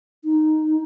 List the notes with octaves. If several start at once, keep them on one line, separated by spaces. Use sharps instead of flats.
D#4